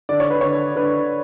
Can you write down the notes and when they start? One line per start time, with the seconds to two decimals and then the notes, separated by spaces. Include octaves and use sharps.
0.09 D3 D5
0.20 C#5
0.30 B4
0.41 D3 C#5
0.76 D3 B4